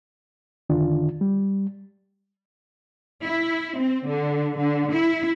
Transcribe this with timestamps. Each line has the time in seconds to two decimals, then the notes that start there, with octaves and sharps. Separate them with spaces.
0.70 F2 D3 D#3 D4 F4
1.21 G3
3.25 E4
3.79 C4
4.09 D3
4.58 D3
4.93 E4